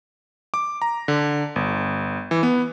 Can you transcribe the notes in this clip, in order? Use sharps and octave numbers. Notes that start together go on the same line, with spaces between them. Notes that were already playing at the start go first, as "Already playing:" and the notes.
D6
A#5
D3
G1
E3
B3